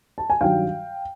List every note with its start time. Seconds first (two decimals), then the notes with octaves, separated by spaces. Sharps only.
0.18 A5
0.30 G#5
0.41 G2 D#3 F#3 F5 G5